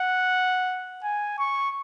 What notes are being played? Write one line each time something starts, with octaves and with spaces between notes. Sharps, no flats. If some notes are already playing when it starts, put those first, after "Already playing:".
Already playing: F#5
G#5
C#6